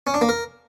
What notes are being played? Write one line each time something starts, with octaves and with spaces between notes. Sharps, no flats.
C#4
D4
A#3
A#4